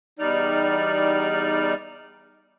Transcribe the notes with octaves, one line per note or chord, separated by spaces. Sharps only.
E2 G3 D#4 D5 F6